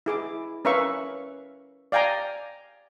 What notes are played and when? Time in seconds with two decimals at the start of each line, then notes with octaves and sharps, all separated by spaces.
0.06 E4 G#4 D6
0.65 C#4 A#4 B4 E5 F5 C#6
1.92 D5 F5 G5 G#5 A#5